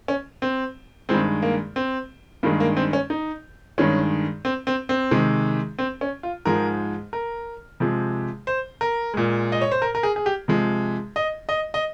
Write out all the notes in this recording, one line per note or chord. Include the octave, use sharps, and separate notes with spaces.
C#4
C4
G2 D#3 G#3 C4
A#3
C4
G2 D#3 G#3 A#3
A#3
C4
C#4
D#4
G2 D#3 G#3 C#4
C4
C4
C4
C3 D#3 G#3
C4
C#4
F4
G#2 F3 G#3 A#4
A#4
C3 F3 G#3
C5
A#4
A#2 G#3
D#5
C#5
C5
A#4
A#4
G#4
G#4
G4
C3 F3 G#3
D#5
D#5
D#5